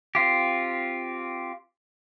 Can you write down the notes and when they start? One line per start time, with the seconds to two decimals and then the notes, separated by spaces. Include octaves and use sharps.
0.15 C4 F4 G4